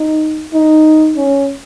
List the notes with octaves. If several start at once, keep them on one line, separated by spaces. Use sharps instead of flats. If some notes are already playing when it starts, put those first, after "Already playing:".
Already playing: D#4
D#4
C#4